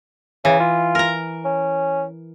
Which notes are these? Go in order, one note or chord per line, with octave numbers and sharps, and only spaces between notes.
C#3 E3
F4
A#4 A#5
C#4